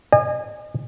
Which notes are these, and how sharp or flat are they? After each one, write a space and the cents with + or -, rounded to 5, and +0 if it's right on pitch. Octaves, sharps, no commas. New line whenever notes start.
D#5 -40 G#5 -25